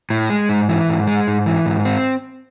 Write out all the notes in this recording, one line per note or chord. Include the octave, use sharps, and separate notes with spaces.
A2
G#3
G#2
E3
G#2
G#3
G#2
E3
G#2
C4